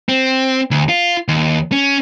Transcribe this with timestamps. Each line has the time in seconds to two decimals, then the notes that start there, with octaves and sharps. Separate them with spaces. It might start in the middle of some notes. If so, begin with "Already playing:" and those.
0.09 C4
0.71 D2
0.89 F4
1.28 D#2
1.72 C#4